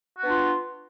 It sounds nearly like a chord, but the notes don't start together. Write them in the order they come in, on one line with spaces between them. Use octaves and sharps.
F#4 B3 D4 F4